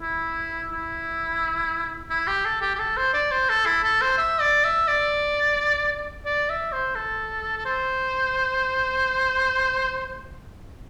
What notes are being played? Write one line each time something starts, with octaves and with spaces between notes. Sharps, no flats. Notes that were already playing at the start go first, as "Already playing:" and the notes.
E4
E4
E4
G4
A4
G4
G4
A4
C5
D5
C5
A4
E4
A4
C5
E5
D5
E5
D5
D5
E5
C5
A4
A4
C5